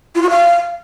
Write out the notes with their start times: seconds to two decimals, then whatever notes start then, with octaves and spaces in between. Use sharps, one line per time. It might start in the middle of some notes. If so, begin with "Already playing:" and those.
0.15 F4
0.22 F#4
0.30 F5